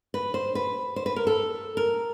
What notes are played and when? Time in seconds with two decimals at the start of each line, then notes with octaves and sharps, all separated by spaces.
0.14 B4
0.34 C5
0.55 B4
0.96 C5
1.06 B4
1.16 A#4
1.27 A4
1.77 A#4